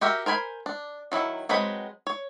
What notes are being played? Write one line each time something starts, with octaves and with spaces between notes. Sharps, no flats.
F#4 G4 A#4 E5
A#4 C5 G#5 B5
D4
D#3 F#3 E4
F#3 G#3 C4 B4 B5
C#5